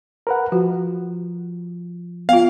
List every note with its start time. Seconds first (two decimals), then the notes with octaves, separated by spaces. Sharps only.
0.27 A#4 B4 F#5
0.52 F3 F#4
2.29 B3 F4 F5